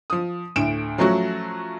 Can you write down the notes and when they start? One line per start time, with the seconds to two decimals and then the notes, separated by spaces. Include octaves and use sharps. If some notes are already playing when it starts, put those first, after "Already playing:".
0.10 F3 D#6
0.56 D2 A2 D7 E7
0.98 F3 F#3 A3 C#4 F#4